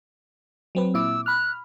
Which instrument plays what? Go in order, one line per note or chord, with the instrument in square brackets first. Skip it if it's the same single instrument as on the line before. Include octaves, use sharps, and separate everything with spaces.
[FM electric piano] F#3 C4 B4
[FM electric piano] A#2 E4 D6 [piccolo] E6
[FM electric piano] B5 F6 [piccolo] F#6